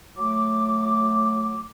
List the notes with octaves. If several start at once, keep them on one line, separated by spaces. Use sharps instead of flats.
F#3 A3 D6